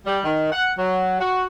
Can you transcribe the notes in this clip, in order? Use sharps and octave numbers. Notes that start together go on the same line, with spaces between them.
G3
D#3
F#5
F#3
F#4